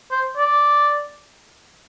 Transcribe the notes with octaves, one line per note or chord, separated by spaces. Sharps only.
C5
D5